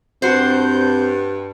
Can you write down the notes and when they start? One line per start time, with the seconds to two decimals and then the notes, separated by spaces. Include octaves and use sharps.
0.22 G2 C4 F#4 C5 G6